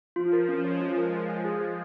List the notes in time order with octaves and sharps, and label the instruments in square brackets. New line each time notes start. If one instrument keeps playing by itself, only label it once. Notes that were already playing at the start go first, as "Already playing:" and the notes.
[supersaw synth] F3 [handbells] F4
[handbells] A#4
C#4
[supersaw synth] G#3 [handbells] C#5
[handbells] F4
A#4
C#5
G#5
G#4
G#4